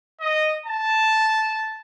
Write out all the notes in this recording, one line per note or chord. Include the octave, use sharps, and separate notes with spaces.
D#5
A5